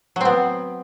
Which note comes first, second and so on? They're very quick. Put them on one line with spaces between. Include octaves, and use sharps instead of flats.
F#3 C4 B3